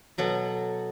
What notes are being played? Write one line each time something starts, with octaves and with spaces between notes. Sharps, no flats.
B2 F#3 A4 F#5